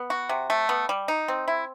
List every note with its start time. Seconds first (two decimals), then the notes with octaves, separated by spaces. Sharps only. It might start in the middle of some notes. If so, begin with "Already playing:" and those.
Already playing: B3
0.10 F#4
0.29 C3
0.50 A3
0.69 B3
0.89 G3
1.08 D#4
1.28 C4
1.48 E4